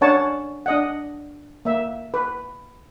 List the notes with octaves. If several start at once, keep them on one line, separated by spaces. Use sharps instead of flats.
C#4 D4 A#4 C#5 F#5 A5
D4 D#5 F#5
A#3 E5
B4